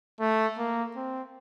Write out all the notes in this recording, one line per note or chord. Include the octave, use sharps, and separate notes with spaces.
A3
A#3
C4